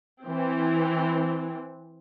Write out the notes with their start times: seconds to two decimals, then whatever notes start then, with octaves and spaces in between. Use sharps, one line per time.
0.23 E3 C4